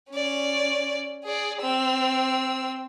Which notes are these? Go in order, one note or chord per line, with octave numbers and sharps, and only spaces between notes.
C#4 D5
G#4 D5
C4 E6